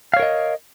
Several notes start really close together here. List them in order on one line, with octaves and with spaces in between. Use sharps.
F5 C#5 A#4 D#5